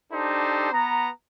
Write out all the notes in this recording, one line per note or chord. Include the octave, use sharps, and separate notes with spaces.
D4 D#4 G4 A4 C5
B3 A#5